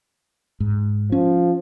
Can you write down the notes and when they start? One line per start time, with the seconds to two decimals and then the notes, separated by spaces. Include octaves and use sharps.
0.60 G#2
1.12 F3 C#4